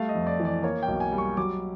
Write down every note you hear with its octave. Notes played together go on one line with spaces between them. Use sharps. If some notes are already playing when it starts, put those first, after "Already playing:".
Already playing: G3 A3 F5
D#5
F2
D5
E3
D5
A#3 C#5
B1 G5
G#5
G3
C#6
F#3 D6